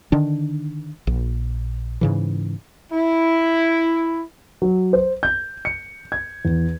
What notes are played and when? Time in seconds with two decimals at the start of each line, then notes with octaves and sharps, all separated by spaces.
0.12 D3 D#3 D4
1.07 A#1
2.01 G#2 C#3 E3
2.91 E4
4.62 F#3
4.93 C5
5.23 G6
5.65 C#7
6.12 G#6
6.45 E2